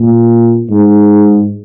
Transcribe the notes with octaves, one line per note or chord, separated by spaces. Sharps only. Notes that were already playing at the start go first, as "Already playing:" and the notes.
Already playing: A#2
G#2